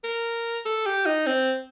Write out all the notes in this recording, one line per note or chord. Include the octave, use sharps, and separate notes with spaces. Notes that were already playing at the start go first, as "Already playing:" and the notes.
A#4
A4
G4
D#4
C4